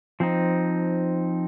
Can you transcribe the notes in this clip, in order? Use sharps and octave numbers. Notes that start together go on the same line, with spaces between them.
F3 C4 D#4